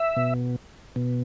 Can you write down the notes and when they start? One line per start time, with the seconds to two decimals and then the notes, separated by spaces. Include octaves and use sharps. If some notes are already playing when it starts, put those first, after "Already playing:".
Already playing: E5
0.16 B2
0.96 B2